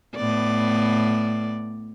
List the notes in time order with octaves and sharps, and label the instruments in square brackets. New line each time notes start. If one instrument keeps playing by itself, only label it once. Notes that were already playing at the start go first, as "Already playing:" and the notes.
[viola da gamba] A2 B3 D5